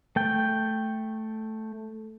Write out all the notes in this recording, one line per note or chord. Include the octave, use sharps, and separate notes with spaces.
A3 G5